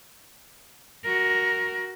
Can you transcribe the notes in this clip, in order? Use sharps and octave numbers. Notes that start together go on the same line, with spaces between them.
F#4 A#4